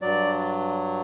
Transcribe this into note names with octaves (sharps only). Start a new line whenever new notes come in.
G2 F#3 D5